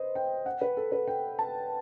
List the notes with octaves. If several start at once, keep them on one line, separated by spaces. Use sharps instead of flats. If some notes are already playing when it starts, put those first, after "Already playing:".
Already playing: B4 C5 D#5
G5
F#5
B4
A4
B4
G5
A5